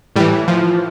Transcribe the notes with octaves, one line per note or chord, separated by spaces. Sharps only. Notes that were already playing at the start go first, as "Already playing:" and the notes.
A2 E3 G3
F3